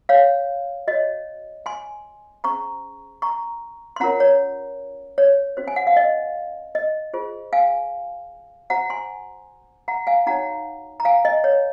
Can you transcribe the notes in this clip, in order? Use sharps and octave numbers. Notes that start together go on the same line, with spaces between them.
C#5 F5
F#4 C#5 D#5
G#5 C6
C#4 G#4 C5 A#5 C#6
A#5 C#6
C6
C#4 F4 A#4 C#5 F#5 A#5
C#5
C#5
C#4 F#4 C5
G#5
F#5
F5
D#5
D#5
F4 G#4 C5
F5 G#5
F#4 C5 F#5 A#5
G#5 C6
F#5 A#5
F5 G#5
D#4 F#4 C#5 F#5 A#5
A#5
F5 G#5
D#5
C#5